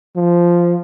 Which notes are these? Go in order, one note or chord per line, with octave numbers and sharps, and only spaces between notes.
F3